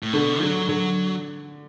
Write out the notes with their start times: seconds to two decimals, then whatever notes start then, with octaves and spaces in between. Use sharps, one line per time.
0.03 A2
0.13 B2 D3
0.41 D3 F#3
0.68 D3 F#3